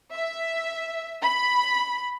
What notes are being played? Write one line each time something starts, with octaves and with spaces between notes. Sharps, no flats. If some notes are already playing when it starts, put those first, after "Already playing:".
E5
B5